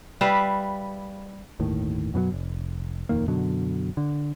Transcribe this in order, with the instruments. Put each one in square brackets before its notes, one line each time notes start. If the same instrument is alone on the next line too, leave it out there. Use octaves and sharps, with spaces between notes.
[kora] G3 B4 E5 F5
[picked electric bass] G1 D#2 A2 D#3
F#2 B2 D#3 F#3
F1
D#1 F2 D#3 A#3
F#2 B2 D3 F#3
D3